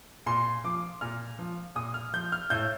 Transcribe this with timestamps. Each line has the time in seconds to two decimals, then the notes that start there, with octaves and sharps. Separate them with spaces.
0.26 A#2 C6
0.64 F3 D6
1.01 A#2 F6
1.39 F3
1.76 A#2 D#6
1.94 F6
2.13 F3 G6
2.32 F6
2.50 A2 G6